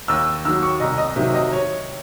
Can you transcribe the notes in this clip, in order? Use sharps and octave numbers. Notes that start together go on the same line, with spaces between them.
D#2 E6
D#3 F#3 E6
C#6
C2 D#5
D#5
C3 D#3 F#3 E5
D#5
C#5